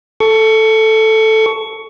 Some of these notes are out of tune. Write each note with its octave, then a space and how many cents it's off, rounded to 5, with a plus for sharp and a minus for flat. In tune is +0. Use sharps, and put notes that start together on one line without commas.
A4 +0 C#6 +15